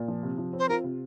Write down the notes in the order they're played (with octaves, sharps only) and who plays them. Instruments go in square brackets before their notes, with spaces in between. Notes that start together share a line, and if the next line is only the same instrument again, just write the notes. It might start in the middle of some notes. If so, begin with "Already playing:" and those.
Already playing: [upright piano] A#2
F3
C3
F3
C4
[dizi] C5
[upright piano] F4 [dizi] A#4
[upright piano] C3